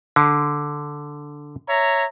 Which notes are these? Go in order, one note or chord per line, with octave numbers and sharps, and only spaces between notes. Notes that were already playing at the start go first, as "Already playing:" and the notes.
D3
C#5 E5 A#5